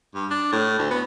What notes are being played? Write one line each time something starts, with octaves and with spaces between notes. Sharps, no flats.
G2
D4
A2
D2
B3